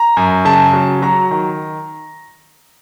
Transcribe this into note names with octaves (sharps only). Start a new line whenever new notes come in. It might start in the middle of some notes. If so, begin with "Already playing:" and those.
Already playing: A#5
F#2
C#3 A5
F#3
F#3 A#5
D#3